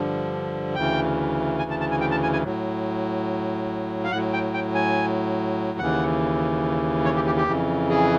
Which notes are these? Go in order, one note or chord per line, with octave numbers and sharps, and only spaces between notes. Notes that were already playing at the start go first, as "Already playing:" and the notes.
Already playing: G2 D3 F3
D2 C#3 E3 G5
G#5
A5
A5
G#5
G5
A5
G#5
G#5
A2 F#3
F5
A2 F#3 F#5
G5
G5
G#5
D#2 C#3 E3 F#5
C#5
G4
G4
G4
F2 C#3 E3
G#4